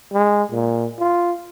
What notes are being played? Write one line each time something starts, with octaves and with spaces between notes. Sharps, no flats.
G#3
A#2
F4